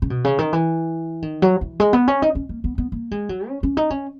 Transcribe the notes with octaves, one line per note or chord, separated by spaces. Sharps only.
C#3
B2
C#3
D#3
E3
D#3
F#3
E3
G#3
B3
C#4
D#4
C#4
A#3
B3
B3
A#3
G#3
F#3
C#4
C#4
D#4
C#4